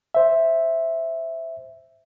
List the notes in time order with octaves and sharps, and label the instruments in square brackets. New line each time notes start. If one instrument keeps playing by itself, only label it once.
[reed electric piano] C5 E5